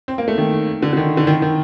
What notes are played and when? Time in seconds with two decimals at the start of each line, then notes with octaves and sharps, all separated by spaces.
0.08 C4
0.18 A#3
0.28 A3
0.38 D#3
0.82 D3
0.93 D3
0.97 D#3
1.17 D3
1.27 D#3
1.42 D#3